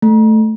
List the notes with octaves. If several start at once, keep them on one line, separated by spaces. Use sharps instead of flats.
A3